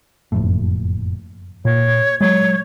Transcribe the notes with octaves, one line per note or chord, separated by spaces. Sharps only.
F#1 F2 A2
A#2 C#5
F#3 G#3 C#5